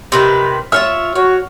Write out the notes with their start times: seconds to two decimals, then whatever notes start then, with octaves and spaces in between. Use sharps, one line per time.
0.12 C3 D#3 B4
0.72 F4 C#5 E5 F6
1.15 F#4 C#5